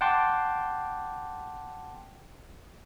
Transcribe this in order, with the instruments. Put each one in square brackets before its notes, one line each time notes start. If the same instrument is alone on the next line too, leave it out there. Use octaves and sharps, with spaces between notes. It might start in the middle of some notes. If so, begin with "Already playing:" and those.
[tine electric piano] F#5 G5 A5 C6 D6